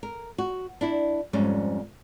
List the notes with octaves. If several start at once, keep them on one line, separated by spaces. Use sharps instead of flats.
A#4
F#4
D4 E4
F2 G#2 G3 C#4